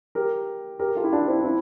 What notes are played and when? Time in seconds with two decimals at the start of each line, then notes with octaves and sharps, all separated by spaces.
0.15 G4 A#4
0.79 G4 A#4
0.95 F4 A4
1.03 E4 G4
1.12 D4 F4
1.28 C4 E4
1.40 D4
1.44 C4 E4